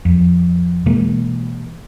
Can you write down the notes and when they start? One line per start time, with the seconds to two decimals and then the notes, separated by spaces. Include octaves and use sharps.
0.05 F2
0.86 B2 E3 G#3 A#3